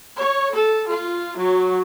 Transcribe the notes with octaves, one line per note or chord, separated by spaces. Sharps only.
C#5
A4
F4
F#3